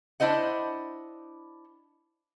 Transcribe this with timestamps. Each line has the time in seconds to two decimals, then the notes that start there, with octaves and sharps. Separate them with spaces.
0.20 D4 E4 C5 D#5 F#5